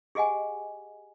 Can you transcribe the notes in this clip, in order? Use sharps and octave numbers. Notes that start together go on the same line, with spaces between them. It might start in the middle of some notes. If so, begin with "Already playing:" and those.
G4 G#4 D#5 F#5 G#5